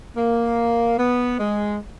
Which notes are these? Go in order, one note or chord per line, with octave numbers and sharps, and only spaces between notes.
A#3
B3
G#3